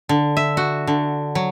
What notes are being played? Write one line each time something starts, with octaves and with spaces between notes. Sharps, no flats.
D3
E5
F#4
D3
F#3